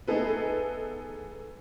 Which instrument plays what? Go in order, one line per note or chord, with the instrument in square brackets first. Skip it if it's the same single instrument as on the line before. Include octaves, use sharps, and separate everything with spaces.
[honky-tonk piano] A3 B3 D#4 G#4 A4 B4